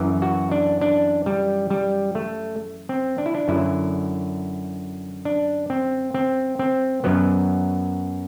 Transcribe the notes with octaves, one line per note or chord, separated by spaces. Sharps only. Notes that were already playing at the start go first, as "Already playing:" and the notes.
Already playing: F#2 E3
F#4
D4
D4
G3
G3
A3
C4
D4
E4
D4
F#2 D3 F#3 E4
D4
C4
C4
C4
F#2 F#3 B3